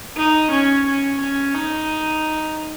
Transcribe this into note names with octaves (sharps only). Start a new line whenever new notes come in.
D#4
C#4
C#4
C#4
D#4